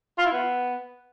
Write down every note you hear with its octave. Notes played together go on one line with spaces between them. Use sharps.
F4
E4
B3